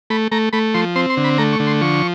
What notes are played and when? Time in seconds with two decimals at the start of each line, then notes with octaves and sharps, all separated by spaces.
0.10 A3 B5
0.32 A3 A#5
0.53 A3 B5
0.74 F3 C6
0.96 C4 C6
1.10 C6
1.17 D3
1.24 B5
1.38 A3 A#5
1.53 C#6
1.60 D3
1.67 C6
1.81 F3 C#6